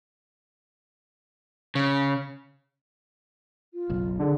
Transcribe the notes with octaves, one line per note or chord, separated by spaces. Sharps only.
C#3
F4
F#1 B1
D3 G#4